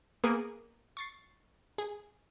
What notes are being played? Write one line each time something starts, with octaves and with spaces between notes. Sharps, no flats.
A#3 B3 G#4
C#6 A6 C7
G#4